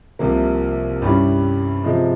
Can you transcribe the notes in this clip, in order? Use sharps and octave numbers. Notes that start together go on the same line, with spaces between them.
C2 C3 F3 A#3
G2 G3 C#4 E4
C3 F3 G#3